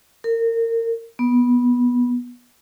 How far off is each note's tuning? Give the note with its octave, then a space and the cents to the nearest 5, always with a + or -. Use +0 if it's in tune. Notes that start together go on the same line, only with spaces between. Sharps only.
A#4 -30
B3 -10